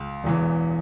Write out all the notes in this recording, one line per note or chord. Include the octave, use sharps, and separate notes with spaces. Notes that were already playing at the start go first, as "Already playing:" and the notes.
Already playing: C#2
E1 E2 E3